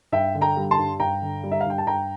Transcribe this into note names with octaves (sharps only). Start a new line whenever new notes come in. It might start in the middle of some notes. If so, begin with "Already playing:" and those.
G2 E5 G5
D3
G5 A#5
G3
A5 C6
G2
G2 G5 A#5
D3
G3
E5
F5
G2 G5
A5
G2 G5 A#5